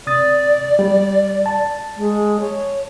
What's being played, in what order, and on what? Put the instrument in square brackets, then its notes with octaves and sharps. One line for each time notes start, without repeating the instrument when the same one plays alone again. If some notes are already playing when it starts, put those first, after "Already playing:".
[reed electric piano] C3 D#6 A6 [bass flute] D5
[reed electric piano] G3
A5
[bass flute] G#3
C#5